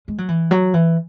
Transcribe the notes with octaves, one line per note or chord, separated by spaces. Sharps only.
G#3
F#3
E3
F#3
E3